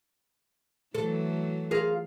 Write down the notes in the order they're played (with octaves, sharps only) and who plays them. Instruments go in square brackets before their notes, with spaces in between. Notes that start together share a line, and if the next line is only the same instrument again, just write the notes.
[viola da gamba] E3 F#3 A3 [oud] A4
[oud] F4 G#4 A#4